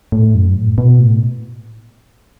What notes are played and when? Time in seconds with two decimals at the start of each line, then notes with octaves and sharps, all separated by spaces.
0.12 A2
0.35 F#2
0.56 A2
0.78 B2
1.00 A2